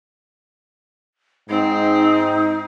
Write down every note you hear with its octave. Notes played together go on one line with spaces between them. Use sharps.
G#2 C4 D#4